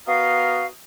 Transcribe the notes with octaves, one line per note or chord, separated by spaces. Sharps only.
B3 F#4 A#4 D#5 F5